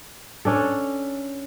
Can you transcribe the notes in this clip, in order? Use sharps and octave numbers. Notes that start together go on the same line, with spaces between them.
C#4 D4 A4